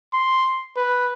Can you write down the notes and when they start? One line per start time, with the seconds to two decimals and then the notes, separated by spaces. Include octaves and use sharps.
0.13 C6
0.77 B4